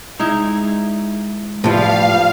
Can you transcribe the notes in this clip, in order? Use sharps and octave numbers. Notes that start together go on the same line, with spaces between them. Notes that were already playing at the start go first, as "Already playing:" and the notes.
G#3 D#4 E4 G#4 A#5
A2 F3 G3 B4 F5